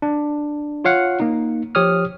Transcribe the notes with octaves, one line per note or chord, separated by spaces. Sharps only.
D4
F4 C#5 F5 F#5
A#3 D#4
F3 G4 C#5 D#6 F6